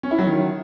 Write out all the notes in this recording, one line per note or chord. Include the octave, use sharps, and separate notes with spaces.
C#4
E4
F#3
D#3